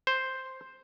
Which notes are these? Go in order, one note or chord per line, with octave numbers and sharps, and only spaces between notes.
C5